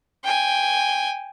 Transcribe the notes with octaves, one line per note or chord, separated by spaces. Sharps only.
G5 G#5